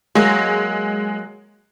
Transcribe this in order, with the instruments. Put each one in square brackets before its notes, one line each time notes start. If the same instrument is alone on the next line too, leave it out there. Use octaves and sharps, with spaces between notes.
[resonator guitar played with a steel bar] F#3 A#3 [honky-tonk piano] G#3